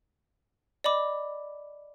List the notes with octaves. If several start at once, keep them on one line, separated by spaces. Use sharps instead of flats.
D5 D#5 B5 D6